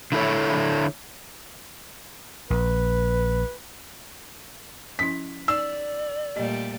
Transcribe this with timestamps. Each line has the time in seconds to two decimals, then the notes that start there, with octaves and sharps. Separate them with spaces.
0.12 D3 E4 A4 C#5
2.50 A#1 B4
4.99 F3 C#4 E4 B6
5.48 D#4 D5 E6
6.36 A#2 G3 A3 G4 D#5